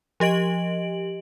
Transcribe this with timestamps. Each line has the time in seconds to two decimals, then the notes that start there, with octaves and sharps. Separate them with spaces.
0.20 F3 G4 D#5 D7 F#7